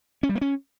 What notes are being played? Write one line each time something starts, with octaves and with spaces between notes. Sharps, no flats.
C#4
G3
A#3
C#4